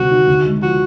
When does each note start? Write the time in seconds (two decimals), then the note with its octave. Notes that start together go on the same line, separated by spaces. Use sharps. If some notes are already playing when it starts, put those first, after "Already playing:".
Already playing: D2 C3 G3 F#4
0.11 D#3
0.27 D2
0.45 G#3
0.62 F3 F#4